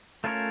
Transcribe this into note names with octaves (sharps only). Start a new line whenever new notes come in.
A3 C#4 F4 A#4 C#5